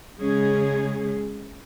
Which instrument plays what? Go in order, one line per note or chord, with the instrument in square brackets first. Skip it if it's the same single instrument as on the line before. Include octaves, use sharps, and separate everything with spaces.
[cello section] C#3 G#3 C#4 G#4